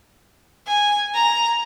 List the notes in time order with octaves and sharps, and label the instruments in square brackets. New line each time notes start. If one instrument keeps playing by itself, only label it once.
[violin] G#5
A#5